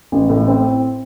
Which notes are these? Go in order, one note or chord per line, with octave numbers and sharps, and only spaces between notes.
A1
A2
C4